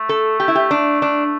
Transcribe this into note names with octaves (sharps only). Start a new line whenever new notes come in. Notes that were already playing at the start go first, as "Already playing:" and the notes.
Already playing: A3
A4
G4
E4
G4
D4
D4